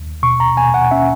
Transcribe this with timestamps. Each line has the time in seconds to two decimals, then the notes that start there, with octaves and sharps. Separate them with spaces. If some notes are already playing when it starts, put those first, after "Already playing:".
Already playing: D#2
0.23 B2 C#6
0.40 A#5
0.57 B2 G#5
0.74 F#5
0.91 C#4 E5